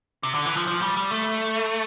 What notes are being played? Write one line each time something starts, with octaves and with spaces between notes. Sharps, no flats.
C3
D3
E3
F3
F3
G3
G3
A3